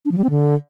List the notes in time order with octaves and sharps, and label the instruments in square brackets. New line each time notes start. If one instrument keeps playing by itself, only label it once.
[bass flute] D4
F3
G3
C4
D3